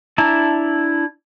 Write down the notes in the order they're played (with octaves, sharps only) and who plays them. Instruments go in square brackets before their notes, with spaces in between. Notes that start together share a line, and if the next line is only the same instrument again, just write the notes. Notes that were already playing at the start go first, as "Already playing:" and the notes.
[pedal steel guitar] D4 E4 A5 A#5